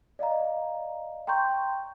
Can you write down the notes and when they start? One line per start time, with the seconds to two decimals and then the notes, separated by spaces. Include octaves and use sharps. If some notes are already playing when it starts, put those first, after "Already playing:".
0.19 D5 D#5 F5 A#5
1.27 G5 A#5 C6 C#6 G6